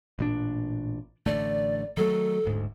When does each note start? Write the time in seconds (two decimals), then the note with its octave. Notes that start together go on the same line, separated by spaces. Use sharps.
0.19 A1 A#2 D4
1.26 A1 D3 A3 D5
1.97 D#3 F#3 A3 A4
2.45 D1 D2 G#2